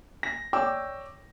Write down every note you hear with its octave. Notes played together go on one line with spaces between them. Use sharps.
A#6
C#5 D5 G5 D6 E6